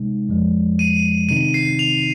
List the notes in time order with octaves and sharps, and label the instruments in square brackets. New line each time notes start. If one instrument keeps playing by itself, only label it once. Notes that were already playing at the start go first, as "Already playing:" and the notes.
Already playing: [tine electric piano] C3 G#3 D#4
F2 F3 G#3
[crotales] D#7
[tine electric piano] C3 D#3 C4 D#4 [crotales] D#7
[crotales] C7
F7